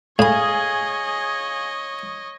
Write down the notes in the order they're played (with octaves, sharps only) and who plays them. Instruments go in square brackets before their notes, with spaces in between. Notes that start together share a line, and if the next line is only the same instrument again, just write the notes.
[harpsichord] A2 B5 [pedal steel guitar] G#4 [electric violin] C#5 D#5 [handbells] F5 G#5